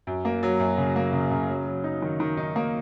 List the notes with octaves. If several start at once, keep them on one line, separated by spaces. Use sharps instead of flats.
F#2
A#3
F#3
F#2
C#3
A#3
C#3
C#3
F#3
F#3
D#4
D#3
D#3
D#4
A#3